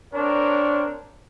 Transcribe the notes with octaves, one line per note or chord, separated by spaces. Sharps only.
C4 D4 A#4 C#5